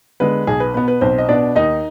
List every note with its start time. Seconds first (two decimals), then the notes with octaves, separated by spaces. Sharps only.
0.20 D3 G#3 B3 B4
0.47 B1 G#4
0.60 B4
0.74 B2 B3 B4
0.88 B4
1.01 B1 C4 C5
1.18 D#5
1.29 B2 B3 D4 D5
1.56 D#2 D#4 D#5